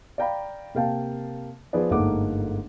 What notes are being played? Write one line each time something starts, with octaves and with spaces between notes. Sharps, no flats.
D5 F5 G5 A#5 B5
C3 A#3 F5 G5 A5
F3 B3 G#4 B4 D5
G1 G#2 A3 A#3 F#5 D6